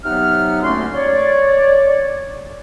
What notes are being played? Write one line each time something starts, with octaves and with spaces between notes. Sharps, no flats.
C3 F#3 B3 D#4 F#5 F6
D2 A3 A#3 C#4 C6
C#5 D5